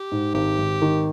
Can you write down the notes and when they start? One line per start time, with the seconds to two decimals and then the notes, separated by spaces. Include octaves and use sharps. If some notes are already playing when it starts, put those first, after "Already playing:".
Already playing: G4
0.12 G#2
0.34 G#1 G4
0.58 G#1
0.82 D#3